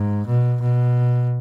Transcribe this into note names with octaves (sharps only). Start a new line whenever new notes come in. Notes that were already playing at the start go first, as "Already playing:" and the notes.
Already playing: G#2
B2
B2